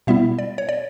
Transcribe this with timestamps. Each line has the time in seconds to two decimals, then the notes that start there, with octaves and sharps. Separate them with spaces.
0.07 B2 G3 B3 E4 E5
0.39 D5
0.58 C#5
0.69 D5